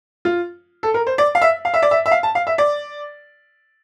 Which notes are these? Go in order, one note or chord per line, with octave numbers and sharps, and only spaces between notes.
F4
A4
A#4
C5
D5
F5
E5
F5
E5
D5
E5
E5
F5
A5
F5
E5
D5